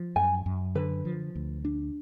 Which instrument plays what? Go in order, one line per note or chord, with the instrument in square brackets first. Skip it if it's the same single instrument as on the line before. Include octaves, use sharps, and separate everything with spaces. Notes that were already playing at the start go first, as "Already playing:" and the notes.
Already playing: [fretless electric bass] F3
[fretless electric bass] F#2 [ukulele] G#5
[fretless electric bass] F#2
[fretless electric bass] D3 [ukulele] B4
[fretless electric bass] F3
D2
D4